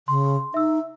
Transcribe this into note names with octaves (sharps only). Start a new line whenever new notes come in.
C#3 C6
D#4 E5 E6